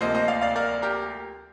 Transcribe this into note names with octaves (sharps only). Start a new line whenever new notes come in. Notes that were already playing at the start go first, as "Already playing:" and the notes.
D2 C3 F3 A#3 C5 D#5
C5 D#5
D5 F5
D5 F5
A#4 D5
G4 A#4